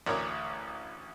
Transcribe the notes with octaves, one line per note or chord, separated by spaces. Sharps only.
A1 D2 A#4 C#5 D6